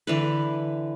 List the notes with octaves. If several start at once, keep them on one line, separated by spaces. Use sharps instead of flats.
D3 E3 B4